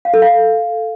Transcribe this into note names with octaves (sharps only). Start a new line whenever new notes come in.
F5
A4
F5